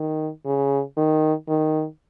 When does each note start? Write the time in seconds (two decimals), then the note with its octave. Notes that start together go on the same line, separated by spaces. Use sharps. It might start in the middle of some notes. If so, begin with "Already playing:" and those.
Already playing: D#3
0.45 C#3
0.97 D#3
1.48 D#3